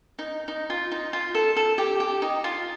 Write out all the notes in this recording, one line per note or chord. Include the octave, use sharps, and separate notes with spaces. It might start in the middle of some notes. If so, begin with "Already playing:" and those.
D#4
D#4
F4
D#4
F4
A4
A4
G4
G4
D#4
F4